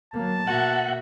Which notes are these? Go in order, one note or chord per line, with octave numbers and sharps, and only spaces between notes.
F#3 A#3 A5
B2 A#3 F#4 E5 F#5